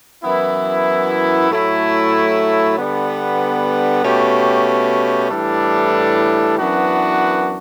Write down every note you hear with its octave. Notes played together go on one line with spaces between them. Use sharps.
F#2 E3 B3 E4
A2 F#3 A3 E4
D3 G3 B3
B2 A3 C#4 G4
A2 E3 G3 D4 A4
F#2 E3 B3 D4 F#4